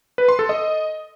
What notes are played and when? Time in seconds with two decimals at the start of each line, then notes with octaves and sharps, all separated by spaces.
0.18 B4
0.29 C6
0.39 A4
0.49 D#5